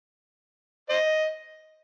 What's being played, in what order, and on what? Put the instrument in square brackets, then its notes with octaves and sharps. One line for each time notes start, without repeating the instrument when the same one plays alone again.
[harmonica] C5 D#5